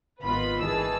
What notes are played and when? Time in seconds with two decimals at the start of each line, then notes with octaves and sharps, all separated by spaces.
0.24 G#1 D#3 B3 F4 B4 B5
0.63 G#1 D#3 E3 G#4 A5 E6